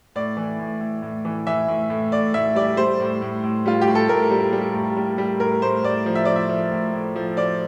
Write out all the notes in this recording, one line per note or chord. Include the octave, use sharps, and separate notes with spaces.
A2 D5
E3
A2
A2
A2
E3
E3 E5
A2
A2
A2 D5
A2 E5
G3 D5
G3 C5
A2
A2
A2
G3 F4
G4
A2
A4
A2 A#4
G3
G3
A2
G3
G3
A2 A#4
A2 C5
A2 D5
F3
E5
F3 D5
E5
F3
A2
A2
F3
F3 D5